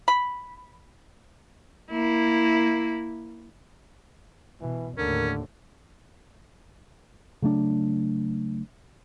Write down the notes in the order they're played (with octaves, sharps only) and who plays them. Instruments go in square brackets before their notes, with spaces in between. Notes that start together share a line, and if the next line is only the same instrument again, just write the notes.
[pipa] B5
[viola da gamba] A#3 E4
[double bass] B2 [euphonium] E3
[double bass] D#2 A2 [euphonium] D3 [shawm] C#4 [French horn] A#4
[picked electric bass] C#3 F#3 A3 D4